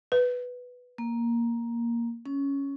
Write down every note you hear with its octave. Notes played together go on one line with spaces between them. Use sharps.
B4
A#3
C#4